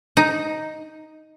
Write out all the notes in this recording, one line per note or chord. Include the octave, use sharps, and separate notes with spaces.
D#4